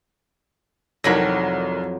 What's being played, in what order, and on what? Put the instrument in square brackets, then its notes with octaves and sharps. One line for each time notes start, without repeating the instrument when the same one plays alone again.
[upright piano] C2 D#3 A#6 [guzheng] F2 F#3 B5